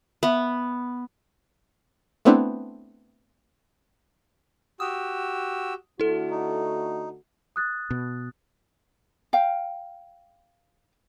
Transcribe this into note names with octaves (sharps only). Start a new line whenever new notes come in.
B3 E5
A3 B3 C4 D4 E4
F#4 G4 D#6 E6
D3 A3 E4 F#4 A4
D#4
D#6 F#6 A6
B2
F5 G5